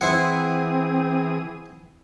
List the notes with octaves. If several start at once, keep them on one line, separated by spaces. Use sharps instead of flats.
E3 C4 E4 G#4 C5 F#5 D#6